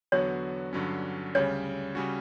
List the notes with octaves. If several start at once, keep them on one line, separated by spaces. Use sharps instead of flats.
E2 D3 F#3 B3 F#4 C#5
G2 D3 F#3 C#4
D2 C#3 G3 C#5
C#3 G3 C#4 F#4